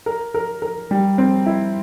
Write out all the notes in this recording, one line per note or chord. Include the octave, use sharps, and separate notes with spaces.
A#4
A#4
A#4
G3
C4
E4